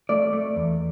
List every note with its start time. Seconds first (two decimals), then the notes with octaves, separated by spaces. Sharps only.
0.09 A3 D5
0.33 A3
0.56 E2